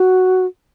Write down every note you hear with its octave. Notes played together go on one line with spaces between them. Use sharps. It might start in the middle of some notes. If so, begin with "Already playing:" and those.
Already playing: F#4